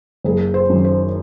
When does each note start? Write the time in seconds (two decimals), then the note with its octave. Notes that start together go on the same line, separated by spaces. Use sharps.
0.24 F#1 G#4
0.54 C5
0.69 F#2 D#3
0.84 C5